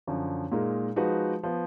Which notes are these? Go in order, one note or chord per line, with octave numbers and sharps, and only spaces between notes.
F#2 D3 F3
A#2 G#3 D#4 A#4
F3 G#3 D#4 F#4 B4
F3 B3